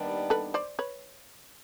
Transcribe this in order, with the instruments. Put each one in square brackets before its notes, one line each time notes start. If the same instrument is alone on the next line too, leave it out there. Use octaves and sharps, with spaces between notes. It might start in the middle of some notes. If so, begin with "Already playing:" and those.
Already playing: [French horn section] D#2 D#3 G3 B3 D4
[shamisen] A4 B4
C5 D5
B4 C#5